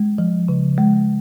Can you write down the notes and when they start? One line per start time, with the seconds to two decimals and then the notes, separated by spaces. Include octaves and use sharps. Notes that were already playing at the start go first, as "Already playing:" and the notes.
Already playing: G#3
0.18 F3
0.48 C#3
0.78 G#3